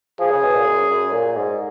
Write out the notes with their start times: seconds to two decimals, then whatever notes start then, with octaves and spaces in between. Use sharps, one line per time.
0.19 F3 G#4
0.31 C#3
0.43 B2
0.54 A#2
0.67 F#2
0.90 F#2
1.13 A#2
1.36 G#2